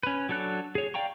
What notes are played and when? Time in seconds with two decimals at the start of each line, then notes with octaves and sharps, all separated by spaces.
0.03 C#4 B4
0.29 F#3 D4 A4 C#5 F#6
0.75 G#4 C#5
0.94 D5 F5 G5 A#5 C#6